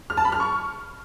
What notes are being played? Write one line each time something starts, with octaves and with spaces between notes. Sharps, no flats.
F6
A5
B5
F6
C#6